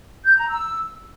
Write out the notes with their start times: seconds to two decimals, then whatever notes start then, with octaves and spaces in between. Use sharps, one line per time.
0.24 G6
0.36 A#5
0.48 E6